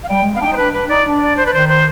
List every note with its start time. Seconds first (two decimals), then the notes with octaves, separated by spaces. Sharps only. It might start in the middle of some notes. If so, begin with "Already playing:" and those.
0.04 F5
0.09 G3 G5
0.21 G#3
0.34 B3 F5
0.41 D4 D#4 G5
0.53 C5
0.57 D4 B4
0.73 D4 B4
0.89 D#4 D5
1.06 D4
1.22 D5
1.37 C5
1.46 B4
1.53 D#3 C5
1.69 C5